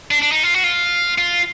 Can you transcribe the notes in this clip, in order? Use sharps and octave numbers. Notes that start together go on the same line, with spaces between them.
D4
D4
D#4
F4
F#4
F4
F4